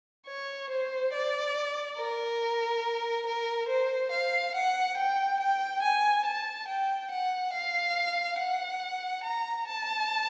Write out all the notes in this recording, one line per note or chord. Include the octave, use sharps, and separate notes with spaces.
C#5
C5
D5
A#4
A#4
C5
F5
F#5
G5
G5
G#5
A5
G5
F#5
F5
F#5
A#5
A5